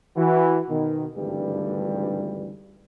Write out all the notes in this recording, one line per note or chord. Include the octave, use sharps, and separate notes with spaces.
E3 F#4
B2 D#3
G#1 D2 G2 E3 G3